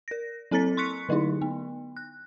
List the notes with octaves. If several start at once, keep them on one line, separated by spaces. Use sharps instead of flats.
A#4 A#6
F#3 C4 A4 A#5 A6 B6
C6 C#6 F#6 B6 C#7
D3 F#3 A3 D#4 E4
B3
F#6